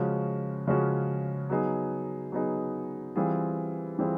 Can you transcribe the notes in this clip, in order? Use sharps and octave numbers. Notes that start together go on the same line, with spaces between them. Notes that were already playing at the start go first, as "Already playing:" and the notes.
Already playing: C#3 F3 G#3 C#4 F#4
C#3 F3 G#3 C#4 F#4
F#3 B3 D#4 G#4
F#3 B3 D#4 G#4
E3 G3 C4 F4 G#4
E3 G3 C4 F4 G#4